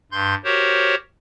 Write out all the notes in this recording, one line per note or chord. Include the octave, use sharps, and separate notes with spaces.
G2 C6 G6
F#4 G4 A#4 C5 C#5